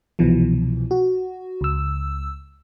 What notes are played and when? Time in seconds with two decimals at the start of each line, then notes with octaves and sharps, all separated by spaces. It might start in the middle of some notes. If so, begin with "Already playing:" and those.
0.19 C2 B2 E3 F3
0.91 F#4
1.61 C#2 E6